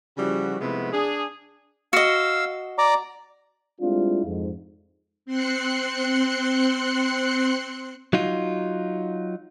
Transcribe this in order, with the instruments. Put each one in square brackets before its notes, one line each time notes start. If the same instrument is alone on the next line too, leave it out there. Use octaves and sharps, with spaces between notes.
[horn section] C#3 F3 G3 E4 F#4
C3 F3 G#3 A3 B3 E4
D4 G#4
[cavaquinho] F#4 D#5 [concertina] F5 E6
[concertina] D5 A#5 D6
[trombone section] G3 G#3 C4 D4 E4 F4
F2 G#2
[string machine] C4 C6 F#6 C#7
[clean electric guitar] F#3 D#4 F4